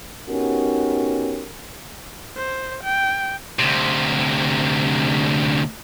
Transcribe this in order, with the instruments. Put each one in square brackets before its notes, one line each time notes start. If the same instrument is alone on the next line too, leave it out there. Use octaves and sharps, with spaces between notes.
[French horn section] B3 C#4 D#4 F#4 G4 A#4
[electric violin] C5
G5
[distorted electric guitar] D2 C3